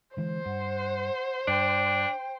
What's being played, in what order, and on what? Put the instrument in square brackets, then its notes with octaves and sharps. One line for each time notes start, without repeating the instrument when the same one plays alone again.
[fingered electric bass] D3 E3 G#3 [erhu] C5
[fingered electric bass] G2 [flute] F#5
[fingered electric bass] G2 [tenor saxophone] D4 [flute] G5